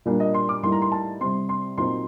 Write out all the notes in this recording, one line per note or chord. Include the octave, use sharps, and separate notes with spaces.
A#2 G3 A#3 D4
D#5
C6
D6
A2 G3 A#3 D#4 C6
A#5
C6
A5
C3 G3 C4 C6
C6
A#2 F#3 C4 D#4 C6